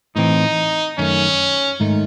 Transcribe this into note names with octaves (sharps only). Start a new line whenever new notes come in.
A2 E3 C4 D#4
F#2 D#3 A3 C#4
G#2 D#3 A3 D#4